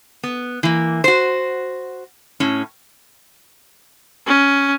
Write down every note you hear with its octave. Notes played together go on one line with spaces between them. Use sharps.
B3
E3 A#3
F#4 C5
A2 C#4
C#4